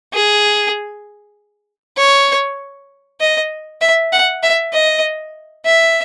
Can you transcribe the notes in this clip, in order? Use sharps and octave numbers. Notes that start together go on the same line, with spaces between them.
G#4
C#5
D#5
E5
F#5
E5
D#5
E5